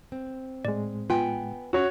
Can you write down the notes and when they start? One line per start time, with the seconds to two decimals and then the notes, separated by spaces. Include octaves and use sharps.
0.12 C4
0.65 A2 G#3 D5
1.10 B3 F4 G5 G#5
1.73 C#4 F#4 C#5